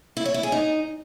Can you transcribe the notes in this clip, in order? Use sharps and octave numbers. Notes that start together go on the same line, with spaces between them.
E4
C#5
E4
G#4
D#4